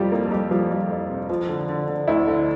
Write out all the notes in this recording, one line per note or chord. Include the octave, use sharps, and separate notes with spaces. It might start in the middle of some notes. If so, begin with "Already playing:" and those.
Already playing: F2 C3 F3 G3 F4 G4
F2 A#3 A#4
A4
F2 G3 G4
F3 G3 F4
G3
F2
C3
F3
D3
D3
D3
D2 E4
D3